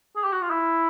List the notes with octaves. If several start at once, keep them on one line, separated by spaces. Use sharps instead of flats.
G#4
G4
F#4
F4
E4